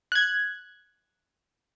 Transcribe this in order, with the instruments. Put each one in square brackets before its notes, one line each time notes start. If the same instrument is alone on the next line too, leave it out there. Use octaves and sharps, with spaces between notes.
[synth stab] F#6 G#6